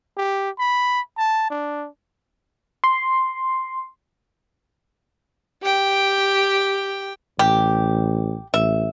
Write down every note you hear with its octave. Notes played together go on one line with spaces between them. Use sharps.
G4
B5
A5
D4
C6
G4 G5
A1 G4
A1 E5